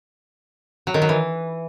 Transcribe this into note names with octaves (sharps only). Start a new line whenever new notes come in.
F#3
D#3
F#3
E3